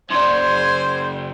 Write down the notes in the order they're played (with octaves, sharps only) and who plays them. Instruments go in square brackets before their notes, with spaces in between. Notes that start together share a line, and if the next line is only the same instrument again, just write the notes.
[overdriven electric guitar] F#2 C#3 [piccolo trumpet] C5 [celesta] D5 C6 [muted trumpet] G#5